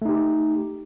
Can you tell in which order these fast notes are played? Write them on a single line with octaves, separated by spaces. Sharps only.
A3 D#4 G4